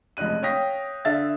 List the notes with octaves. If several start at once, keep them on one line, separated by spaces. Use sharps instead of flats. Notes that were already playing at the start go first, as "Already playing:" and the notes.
F1 C#2 D#5 F#6 D#7
C#5 F5 G5 D#6 A#6 B6
D3 E5 F5 E6 A6